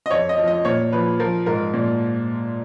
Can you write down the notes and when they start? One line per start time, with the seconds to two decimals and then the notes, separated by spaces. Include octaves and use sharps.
0.06 D#5
0.11 F2 C#5
0.29 D#5
0.38 F3
0.48 D#5
0.65 A#2 C#5
0.93 F3 B4
1.19 F3 A#4
1.46 G#2 A#4
1.74 A#2